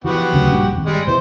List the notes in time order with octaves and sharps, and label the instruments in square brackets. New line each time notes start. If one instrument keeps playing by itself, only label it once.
[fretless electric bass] E3 F3 [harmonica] B3 F#4 G4
[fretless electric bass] D2 C#3 F#3
A#1 G2
D1 G#1
[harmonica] G3 G#3
[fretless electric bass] B2 E3 [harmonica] C5